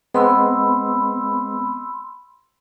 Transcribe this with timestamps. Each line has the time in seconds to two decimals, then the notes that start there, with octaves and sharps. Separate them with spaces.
0.14 G#3 B3 C4 B5 C6 E6